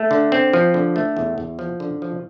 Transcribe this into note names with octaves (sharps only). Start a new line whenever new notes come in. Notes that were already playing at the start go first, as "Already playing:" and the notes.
Already playing: A3
D3
C4
F3
D3
A3
E2
E2
F3
D3
F3